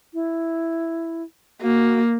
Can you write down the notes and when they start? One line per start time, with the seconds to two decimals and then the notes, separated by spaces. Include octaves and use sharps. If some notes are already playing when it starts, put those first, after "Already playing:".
0.14 E4
1.62 A#3 F#4